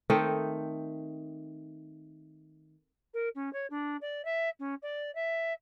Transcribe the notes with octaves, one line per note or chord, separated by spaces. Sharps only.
D#3 A3 C4 D#4
A#4
C#4
C#5
D4
D5
E5
C#4
D5
E5